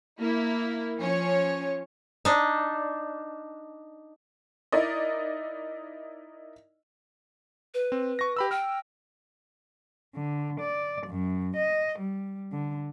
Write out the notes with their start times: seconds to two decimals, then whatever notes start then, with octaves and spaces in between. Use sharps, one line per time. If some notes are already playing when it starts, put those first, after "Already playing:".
0.20 A#3 E4
0.98 F3 C#4 C#5
2.25 D4 D#4
4.72 D#4 E4 A#4 D5 D#5
7.74 B4
7.92 C4
8.19 C#6 A#6
8.37 G4 B5 E6
8.51 G5 F6
10.15 D3
10.60 D5
11.07 F#2
11.57 D#5
11.99 G3
12.52 D3